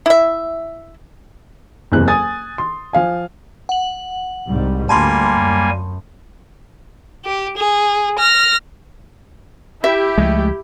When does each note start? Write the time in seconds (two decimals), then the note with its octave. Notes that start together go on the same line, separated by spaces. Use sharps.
0.06 E4 E5
1.92 F#1 E2 C3 F#6
2.08 G#5 D#6 A6
2.58 C6
2.93 F3 F5 G#5
3.69 F#5 F#7
4.47 C2 G#2 G3
4.89 D2 G3 A#3 G#5 A5 B5 C6
5.32 F#2
7.25 G4
7.57 G#4
8.19 F6 A#6
9.84 E4 G4 E5
10.18 C#2 F3 G#3 A3